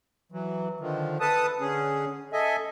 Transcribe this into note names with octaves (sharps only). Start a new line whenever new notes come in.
E3 F#3
D3 D#3 F3
A4 B4 A5 D#6
D3 C#4 G#4
A4 D#5 E5 G#5